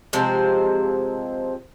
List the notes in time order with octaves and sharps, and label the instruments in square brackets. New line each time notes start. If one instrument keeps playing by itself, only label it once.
[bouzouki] C3 F3 G#3 C5